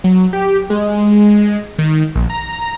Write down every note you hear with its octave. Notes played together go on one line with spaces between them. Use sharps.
F#3
G4
G#3
D#3
A#1
A#5